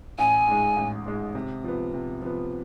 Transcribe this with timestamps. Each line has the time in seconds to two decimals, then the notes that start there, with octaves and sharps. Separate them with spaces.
0.18 A1 G#5
0.47 G#2 G#3
0.77 A1
1.06 G#2 G#3
1.35 C3
1.64 F3 B3
1.94 C3
2.22 F3 B3